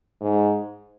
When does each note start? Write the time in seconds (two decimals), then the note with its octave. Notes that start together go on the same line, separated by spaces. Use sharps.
0.21 G#2